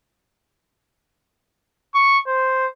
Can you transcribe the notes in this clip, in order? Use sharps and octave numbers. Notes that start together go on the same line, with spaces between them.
C#6
C5